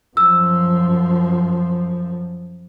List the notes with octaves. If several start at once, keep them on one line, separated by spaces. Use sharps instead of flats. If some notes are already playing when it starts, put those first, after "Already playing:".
F#2 F3 E6